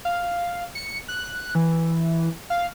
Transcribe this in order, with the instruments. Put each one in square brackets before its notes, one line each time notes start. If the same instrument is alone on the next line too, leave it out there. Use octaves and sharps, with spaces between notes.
[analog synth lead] F5
C#7
F#6
E3
F5